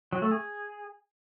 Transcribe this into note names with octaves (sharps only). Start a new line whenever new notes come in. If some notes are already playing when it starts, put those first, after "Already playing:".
F#3
A3
G#4